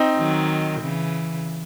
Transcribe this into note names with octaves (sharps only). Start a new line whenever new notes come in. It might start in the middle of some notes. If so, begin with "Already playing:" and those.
Already playing: C4 D#4
D#3 F#3
C#3 E3